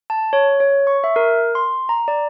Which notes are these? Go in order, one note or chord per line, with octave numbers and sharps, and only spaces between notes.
A5
C#5
C#5
C#6
E5
A#4
C6
A#5
D5